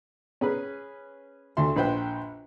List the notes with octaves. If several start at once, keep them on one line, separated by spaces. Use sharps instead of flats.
C#4 G#4 B4
D2 A4 E5 C6
A#1 B4 C5 G5